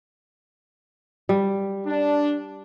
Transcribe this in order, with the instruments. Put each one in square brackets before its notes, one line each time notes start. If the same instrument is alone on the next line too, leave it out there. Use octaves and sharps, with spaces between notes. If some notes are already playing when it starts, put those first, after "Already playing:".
[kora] G3
[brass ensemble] D4